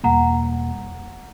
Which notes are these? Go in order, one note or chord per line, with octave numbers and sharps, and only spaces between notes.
E2 B2 G3 A#3 F#5 A#5